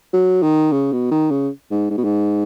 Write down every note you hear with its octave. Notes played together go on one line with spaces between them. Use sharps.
F#3
D#3
C#3
B2
D#3
C#3
G#2
G#2
B2
G#2